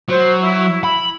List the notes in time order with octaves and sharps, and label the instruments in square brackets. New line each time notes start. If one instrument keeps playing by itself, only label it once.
[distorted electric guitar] F#3 [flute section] C5
[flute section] E4
[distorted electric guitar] B5